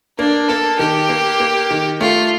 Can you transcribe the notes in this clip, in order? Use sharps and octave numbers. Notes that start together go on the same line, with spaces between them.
A#3 D4
A#3 A4
D#3 G4
A#3
A#3
D#3
A3 F4